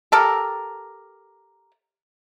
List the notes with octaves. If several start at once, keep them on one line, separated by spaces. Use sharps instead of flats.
G4 A4 A#4